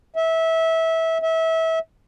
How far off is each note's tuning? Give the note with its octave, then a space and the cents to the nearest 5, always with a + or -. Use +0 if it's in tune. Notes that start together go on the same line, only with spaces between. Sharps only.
E5 -20
E5 -25